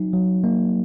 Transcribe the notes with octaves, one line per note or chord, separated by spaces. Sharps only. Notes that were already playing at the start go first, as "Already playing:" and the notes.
Already playing: F#3 D#4
F#3
A#3